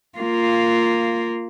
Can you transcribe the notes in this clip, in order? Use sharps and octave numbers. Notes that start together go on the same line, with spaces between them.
A#3 F4